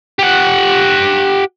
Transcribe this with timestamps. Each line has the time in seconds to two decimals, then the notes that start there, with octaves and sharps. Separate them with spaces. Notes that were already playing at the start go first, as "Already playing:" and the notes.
0.19 G4 F#5